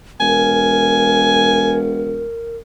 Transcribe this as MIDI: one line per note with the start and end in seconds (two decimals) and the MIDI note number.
0.20 2.30 28
0.20 2.56 70
0.20 1.77 80